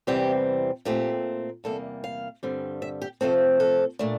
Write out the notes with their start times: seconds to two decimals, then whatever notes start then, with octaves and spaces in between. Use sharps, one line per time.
0.07 E2 C3 E3 G3 C4 G4
0.85 A#2 A3 C4 G4
1.64 E2 C3 G3 A#3 A4
2.04 F5
2.43 G2 D3 G3 C4
2.82 E5
3.02 G4
3.21 C3 F3 A3 C4 A4
3.60 A4
3.99 A#2 A3 D4